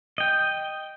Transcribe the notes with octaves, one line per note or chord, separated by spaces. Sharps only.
D#5 G5